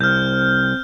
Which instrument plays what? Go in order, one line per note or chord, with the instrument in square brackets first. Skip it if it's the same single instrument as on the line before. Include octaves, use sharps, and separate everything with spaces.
[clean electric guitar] C2 [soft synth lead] C4 [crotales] F6 G6